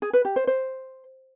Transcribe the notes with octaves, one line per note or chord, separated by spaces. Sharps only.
G#4
B4
G4
C5
C5